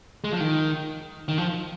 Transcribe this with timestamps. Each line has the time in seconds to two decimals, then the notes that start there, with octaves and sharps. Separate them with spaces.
0.24 G#3
0.32 F3
0.40 D#3
1.28 D#3
1.38 F3